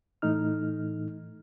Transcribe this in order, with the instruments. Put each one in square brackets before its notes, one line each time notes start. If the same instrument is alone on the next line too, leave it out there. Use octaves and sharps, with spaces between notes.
[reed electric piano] A2 E3 A3 D#4 F6